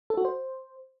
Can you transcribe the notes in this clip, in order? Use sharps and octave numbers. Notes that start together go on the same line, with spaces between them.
A4
F#4
C5